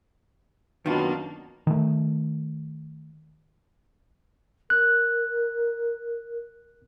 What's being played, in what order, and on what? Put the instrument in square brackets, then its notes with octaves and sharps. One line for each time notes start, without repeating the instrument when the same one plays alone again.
[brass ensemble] F#2 B2 [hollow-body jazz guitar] D#3 F4 [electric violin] A#3 D4
[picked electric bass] D#3 A3
[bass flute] A#4 [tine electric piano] F#6